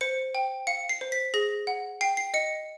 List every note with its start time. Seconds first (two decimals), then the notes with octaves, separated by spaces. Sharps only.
0.01 C5 C#7
0.35 G5
0.67 F5 C#7
0.89 C7
1.01 C5
1.12 B6
1.34 G#4 A#6
1.67 F#5
2.01 G5 C7
2.17 C7
2.34 D#5 C#7